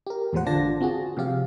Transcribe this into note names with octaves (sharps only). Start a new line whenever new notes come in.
G4 A#4
E2 A2 F3 G#3 C5 F#5
G#1 D3 F4 D5 A5 A#6
C4 F4 F#4 G#4
C3 F3 G4 F5